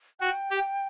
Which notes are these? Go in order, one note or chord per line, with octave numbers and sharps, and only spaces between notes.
F#4 G5
G4